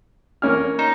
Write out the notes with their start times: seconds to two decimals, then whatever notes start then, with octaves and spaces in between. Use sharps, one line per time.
0.42 A#3 C#4 F6
0.79 D#4